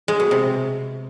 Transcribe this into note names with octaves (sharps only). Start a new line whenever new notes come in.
G#3
B2
C3